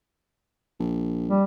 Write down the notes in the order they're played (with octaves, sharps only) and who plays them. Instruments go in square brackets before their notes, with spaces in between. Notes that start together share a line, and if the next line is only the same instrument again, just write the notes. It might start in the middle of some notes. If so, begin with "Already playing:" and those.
[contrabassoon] A#1
[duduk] G3